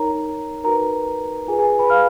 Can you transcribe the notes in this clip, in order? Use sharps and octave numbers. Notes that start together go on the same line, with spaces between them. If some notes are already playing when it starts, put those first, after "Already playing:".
Already playing: D#4 A#4 C#5 A#5
D#4 F#4 A#4 B4 A#5
F4 G#4 B4 G#5
G#4 G#5
B4 B5
F5 F6